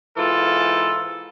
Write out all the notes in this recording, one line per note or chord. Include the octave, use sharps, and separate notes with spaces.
G#2 E3 F4 A4